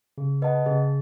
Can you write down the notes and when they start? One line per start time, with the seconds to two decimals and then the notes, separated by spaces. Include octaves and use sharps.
0.18 C#3 G#4
0.42 B4 D#5 F#5 A5
0.66 C#3 G#4